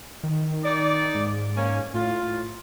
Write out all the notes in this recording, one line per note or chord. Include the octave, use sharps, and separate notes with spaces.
D#3
D#4 D5
G#2
A#3 C#4
A2 F4